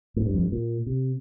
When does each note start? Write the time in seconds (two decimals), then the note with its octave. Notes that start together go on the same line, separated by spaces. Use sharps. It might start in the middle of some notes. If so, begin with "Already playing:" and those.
0.16 A2
0.26 G2
0.34 F2
0.43 G2
0.52 A#2
0.86 C3